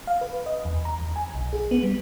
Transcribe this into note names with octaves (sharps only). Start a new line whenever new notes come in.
F5
B4
D#5
E2
A#5
E2
G#5
B1
G#4
B3
G3